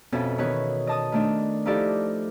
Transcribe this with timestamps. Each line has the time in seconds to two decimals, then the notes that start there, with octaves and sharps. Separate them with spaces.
0.12 F2 B2 C#4 A4 E5
0.38 D#3 E3 B3 F#4 B4 C#5
0.87 D#5 A5 D#6
1.12 D#3 A3 D4
1.66 F3 D#4 E4 G4 A4 D5